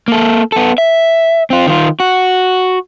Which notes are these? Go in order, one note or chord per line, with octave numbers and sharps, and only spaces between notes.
A#3 A4
B3 A4
E5
C4 F4
D#3 F4
F#4